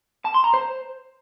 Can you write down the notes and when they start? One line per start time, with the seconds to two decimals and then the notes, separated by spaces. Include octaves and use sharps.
0.25 A5
0.34 C6
0.44 A#5
0.54 C5